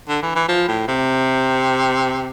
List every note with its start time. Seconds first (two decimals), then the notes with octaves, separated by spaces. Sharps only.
0.08 D3
0.22 E3
0.35 E3
0.48 F3
0.68 A2
0.88 C3